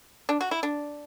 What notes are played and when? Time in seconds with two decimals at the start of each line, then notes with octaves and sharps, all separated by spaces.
0.29 D4
0.41 F#4
0.51 E4
0.63 D4